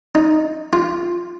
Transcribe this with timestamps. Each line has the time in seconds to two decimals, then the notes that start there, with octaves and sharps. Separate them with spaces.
0.15 D#4
0.73 F4